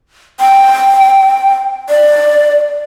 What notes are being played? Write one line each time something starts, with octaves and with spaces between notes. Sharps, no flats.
G5
D5